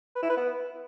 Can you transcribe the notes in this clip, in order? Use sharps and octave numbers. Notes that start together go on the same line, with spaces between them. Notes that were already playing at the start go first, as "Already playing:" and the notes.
B4
E4
B4
B3